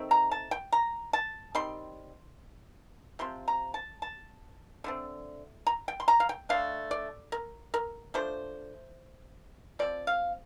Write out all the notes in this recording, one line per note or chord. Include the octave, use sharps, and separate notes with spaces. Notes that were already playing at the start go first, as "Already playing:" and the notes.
Already playing: D#3 A3 C4
A#5
A5
G5
A#5
A5
D#3 G3 C4 C6
C3 F3 C4 C6
A#5
A5
A5
D3 A3 C4
A#5
G5
C6
A#5
F5
G5
D3 A3 D4 F5
D5
A#4
A#4
F3 A3 D4 C5
F3 C4 D5
F5